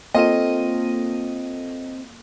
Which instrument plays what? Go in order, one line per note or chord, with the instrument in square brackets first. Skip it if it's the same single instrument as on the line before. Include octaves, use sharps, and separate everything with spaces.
[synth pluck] A#3 A4 D#7 [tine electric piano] C4 [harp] F4 C#5 C6 [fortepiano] D#5